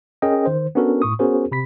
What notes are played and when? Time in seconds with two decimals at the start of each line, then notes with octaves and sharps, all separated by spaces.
0.22 C#4 G#4 A#4 D#5 G5
0.46 D#3 C5
0.75 B3 C#4 D4 F#4 A4 A#4
1.02 A2 C#6 D#6
1.19 B3 C#4 F#4 G#4 A#4 C5
1.52 C3 B5 B6